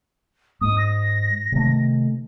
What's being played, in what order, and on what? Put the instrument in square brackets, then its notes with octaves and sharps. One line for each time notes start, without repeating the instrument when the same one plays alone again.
[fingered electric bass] G#2 [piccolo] D#6
[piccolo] A#6
[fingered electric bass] C3 D#3 A3